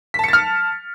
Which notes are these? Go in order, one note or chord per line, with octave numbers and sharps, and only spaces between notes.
A5 F6 A6 B6 C#7